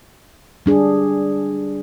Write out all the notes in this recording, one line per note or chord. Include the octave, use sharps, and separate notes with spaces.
G3 D4 G#4